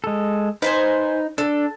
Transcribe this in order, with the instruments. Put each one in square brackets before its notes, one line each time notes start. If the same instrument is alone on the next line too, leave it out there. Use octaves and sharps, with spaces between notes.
[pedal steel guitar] G#3 A4
[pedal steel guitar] D#4 [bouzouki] B4 C5 G#5
[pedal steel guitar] D4 [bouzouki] A4